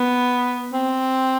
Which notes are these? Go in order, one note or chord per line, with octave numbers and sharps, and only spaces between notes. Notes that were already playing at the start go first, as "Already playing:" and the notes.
Already playing: B3
C4